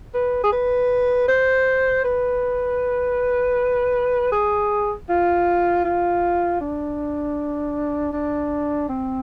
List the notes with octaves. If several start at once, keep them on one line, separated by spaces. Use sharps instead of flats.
B4
G#4
B4
C5
B4
G#4
F4
F4
D4
D4
C4